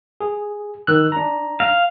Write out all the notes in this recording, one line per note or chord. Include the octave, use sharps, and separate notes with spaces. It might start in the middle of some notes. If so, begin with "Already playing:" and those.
G#4
D#3 E6 F#6
D4 A#5
F5